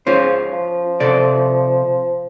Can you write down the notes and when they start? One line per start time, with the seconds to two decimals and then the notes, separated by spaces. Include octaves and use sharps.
0.07 C#3 C#4 F4 C5
0.53 F3
1.00 C3 A4 D5